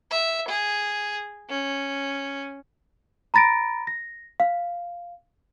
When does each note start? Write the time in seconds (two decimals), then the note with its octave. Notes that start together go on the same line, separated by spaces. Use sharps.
0.11 E5
0.48 G#4
1.49 C#4
3.34 A#5 B5 A6 A#6 D7
3.87 A#6
4.40 F5